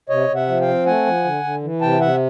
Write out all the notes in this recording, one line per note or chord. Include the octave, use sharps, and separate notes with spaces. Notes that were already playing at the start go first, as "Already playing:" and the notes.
C3 C#5 D#5
C3
E5 F#5
F3
F5 G5
C4
A3 F#5 G#5
F3
D3
D3
E3
C3 G5 A5
C3 E5 F#5